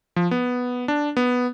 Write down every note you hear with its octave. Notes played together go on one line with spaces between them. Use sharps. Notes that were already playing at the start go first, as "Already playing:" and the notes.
F3
B3
D4
B3